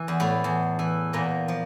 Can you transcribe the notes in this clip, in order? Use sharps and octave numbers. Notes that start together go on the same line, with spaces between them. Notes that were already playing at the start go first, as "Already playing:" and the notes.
Already playing: E3
E2
A2 A3
E2
E3
E2 A#2 A#3
F3